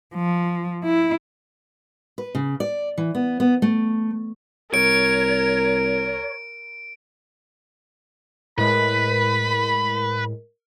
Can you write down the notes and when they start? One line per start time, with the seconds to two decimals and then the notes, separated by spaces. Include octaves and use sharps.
0.15 F3
0.85 E4
2.18 B4
2.35 C#3
2.60 D5
2.98 E3
3.15 B3
3.40 B3
3.62 A3
4.74 C2 A#4 C#5 D7
8.58 A2 G#3 A#4 B4 B5